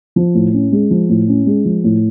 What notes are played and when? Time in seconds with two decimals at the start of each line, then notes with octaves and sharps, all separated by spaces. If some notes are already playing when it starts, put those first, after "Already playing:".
0.16 F3
0.34 A2
0.53 C#4
0.72 G#3
0.90 F3
1.09 A2
1.28 C#4
1.46 G#3
1.65 F3
1.84 A2